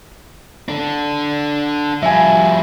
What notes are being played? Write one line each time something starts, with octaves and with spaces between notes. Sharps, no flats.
D4 A4
F3 G3 E5 G#5